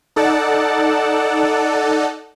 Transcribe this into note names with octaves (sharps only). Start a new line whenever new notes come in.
D#4 A4 D5 F#5 A5